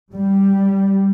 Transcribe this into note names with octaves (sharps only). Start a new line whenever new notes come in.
G3